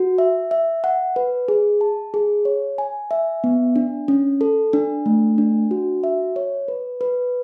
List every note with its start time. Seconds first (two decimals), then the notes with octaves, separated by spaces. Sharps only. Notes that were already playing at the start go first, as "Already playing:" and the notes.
Already playing: F#4
0.18 E5
0.51 E5
0.84 F#5
1.16 B4
1.48 G#4
1.81 A5
2.14 G#4
2.45 C#5
2.78 G#5
3.11 E5
3.44 B3
3.76 D4
4.08 C#4
4.41 A4
4.73 D4
5.06 A3
5.38 D4
5.71 F#4
6.04 E5
6.36 C#5
6.68 B4
7.01 B4